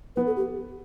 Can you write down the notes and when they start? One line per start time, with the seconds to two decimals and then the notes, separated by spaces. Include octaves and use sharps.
0.16 B3 B4
0.27 A4
0.37 G4